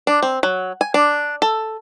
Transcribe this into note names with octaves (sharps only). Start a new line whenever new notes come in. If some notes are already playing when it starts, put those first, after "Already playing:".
D4
C4
F#3
G#5
D4
A4